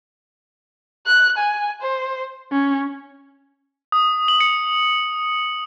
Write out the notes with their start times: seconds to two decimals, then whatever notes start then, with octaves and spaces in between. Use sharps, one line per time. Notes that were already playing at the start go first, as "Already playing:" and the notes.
1.07 F#6
1.37 G#5
1.82 C5
2.52 C#4
3.92 D#6
4.28 F#7
4.40 C#7